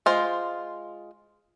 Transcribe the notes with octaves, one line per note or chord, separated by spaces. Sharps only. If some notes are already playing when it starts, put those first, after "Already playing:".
G#3 F4 C5